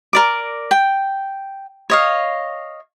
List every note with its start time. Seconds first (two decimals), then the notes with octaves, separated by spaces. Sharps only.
0.13 A#4 D5 D6
0.71 G5
1.90 C#5 D#5 F5